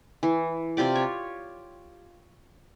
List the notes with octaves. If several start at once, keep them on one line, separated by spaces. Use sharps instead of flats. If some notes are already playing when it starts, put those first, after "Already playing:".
E3
C3 F4 G4 D5
C#5